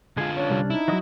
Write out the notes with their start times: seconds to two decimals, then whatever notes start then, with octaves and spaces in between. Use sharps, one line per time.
0.17 D3 G#3 F4 G#4
0.37 C#4 D4 C#5
0.50 C2 G3
0.70 D#4 E4
0.88 E3 F#3 F#4 D#5 D#6